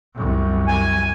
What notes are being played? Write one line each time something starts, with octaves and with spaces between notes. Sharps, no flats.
C2 F#2
G#5